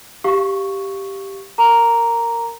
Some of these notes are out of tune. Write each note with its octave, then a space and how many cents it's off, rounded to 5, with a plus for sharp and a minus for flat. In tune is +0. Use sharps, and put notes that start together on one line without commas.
G4 -5 F5 +0 C#6 +0
A#4 -15 A#5 +0 D6 -25